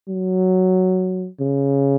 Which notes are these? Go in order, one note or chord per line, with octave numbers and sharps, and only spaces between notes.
F#3
C#3